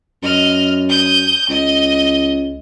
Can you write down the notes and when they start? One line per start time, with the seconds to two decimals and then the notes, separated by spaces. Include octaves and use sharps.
0.23 F#2 D#5 F6
0.89 D#6 G6
1.49 C#2 D#5